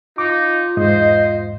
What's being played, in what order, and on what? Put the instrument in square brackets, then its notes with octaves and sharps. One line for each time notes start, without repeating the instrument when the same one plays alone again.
[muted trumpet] D#4 [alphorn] F4 [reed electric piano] D6
[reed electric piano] E2 G#2 [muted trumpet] C5 [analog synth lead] D#5